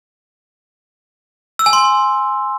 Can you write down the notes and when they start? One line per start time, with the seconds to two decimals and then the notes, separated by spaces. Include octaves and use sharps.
1.59 E6
1.66 G#5
1.73 C6